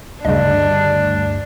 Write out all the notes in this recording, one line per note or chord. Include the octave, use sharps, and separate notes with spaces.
D2 G2 C#3 D4 D#5